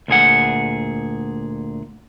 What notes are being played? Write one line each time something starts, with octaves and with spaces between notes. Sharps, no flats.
D2 A#2 G#4 F#5